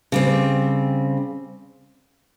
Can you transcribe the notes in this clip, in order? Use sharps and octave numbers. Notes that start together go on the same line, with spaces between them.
C#3 G3 C4